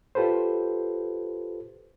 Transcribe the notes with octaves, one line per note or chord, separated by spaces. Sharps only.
F4 G4 A4 B4 C5